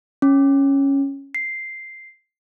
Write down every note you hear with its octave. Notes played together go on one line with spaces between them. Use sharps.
C#4
C7